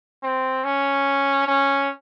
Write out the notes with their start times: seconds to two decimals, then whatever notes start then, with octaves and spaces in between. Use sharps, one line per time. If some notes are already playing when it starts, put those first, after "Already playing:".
0.23 C4
0.64 C#4
1.47 C#4